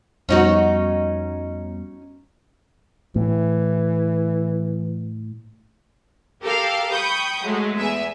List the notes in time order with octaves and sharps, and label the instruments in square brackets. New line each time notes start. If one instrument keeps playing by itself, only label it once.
[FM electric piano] F2 G3 B3 [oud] C#4 D#4 F#4
[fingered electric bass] A2 [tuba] E3
[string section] G4 A4 A#4 F5
G5 B5 C#6 D#6 G6
F#3 G#3 A3
E2 E5 G#5